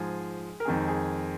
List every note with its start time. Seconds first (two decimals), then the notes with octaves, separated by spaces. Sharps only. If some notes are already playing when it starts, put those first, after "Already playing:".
Already playing: G#2 F3 G#3 G#4
0.60 A#4
0.65 F2 D#3 G#3 G#4
0.88 G#4